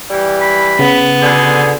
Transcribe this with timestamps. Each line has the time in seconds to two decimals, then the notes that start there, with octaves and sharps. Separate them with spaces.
0.10 E3 G3
0.41 B5
0.79 C#3 B3
1.22 B2 D3 G#4